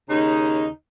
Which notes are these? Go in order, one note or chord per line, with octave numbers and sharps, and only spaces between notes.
D#2 C#3 D#4